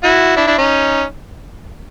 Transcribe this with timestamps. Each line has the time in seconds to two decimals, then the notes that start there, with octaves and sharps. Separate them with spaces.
0.04 E4 F#4
0.36 D4 E4
0.47 D4 E4
0.58 C#4 D#4